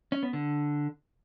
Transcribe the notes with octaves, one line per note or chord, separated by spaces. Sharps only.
C#4
B3
D3